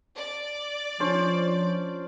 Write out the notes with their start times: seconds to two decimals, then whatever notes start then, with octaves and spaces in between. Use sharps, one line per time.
0.15 D5
1.00 F3 C#4 D4 C5 A5